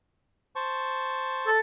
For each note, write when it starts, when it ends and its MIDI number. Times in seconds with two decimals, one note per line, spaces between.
0.56 1.50 72
0.56 1.50 81
0.56 1.50 85
1.47 1.60 69